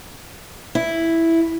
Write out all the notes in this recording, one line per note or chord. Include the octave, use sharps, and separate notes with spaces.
E4